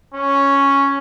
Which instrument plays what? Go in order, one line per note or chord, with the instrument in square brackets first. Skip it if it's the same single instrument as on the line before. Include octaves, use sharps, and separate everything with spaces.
[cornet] C#4